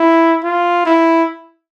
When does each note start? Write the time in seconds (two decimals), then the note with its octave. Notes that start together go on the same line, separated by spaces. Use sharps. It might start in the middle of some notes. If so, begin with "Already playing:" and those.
Already playing: E4
0.44 F4
0.85 E4